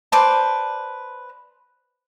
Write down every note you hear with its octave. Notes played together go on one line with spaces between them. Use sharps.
B4 C5 D5 A5